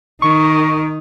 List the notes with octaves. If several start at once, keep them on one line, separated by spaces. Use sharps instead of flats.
D#3 D#4 C#6